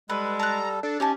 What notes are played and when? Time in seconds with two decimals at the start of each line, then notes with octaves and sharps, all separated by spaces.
0.09 G3 G#3 A4 B4
0.39 A5 A#5 F#6
0.83 D4 A4
1.00 C#4 D#4 G4 G#5 A5